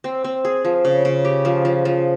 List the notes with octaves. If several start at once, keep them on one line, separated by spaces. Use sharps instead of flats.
C4
C4
G#4
F3
C#3
C#3
G4
F3
F3
F3